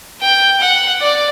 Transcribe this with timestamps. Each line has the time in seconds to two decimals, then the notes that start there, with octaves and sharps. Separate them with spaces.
0.21 G5
0.61 F#5
1.01 D5